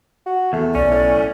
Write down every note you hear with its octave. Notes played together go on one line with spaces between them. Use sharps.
F#4
E2 A3
B1 C#4 D5
A2